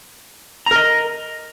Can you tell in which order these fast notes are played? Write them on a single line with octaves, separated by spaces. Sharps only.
A#5 A#4 D#5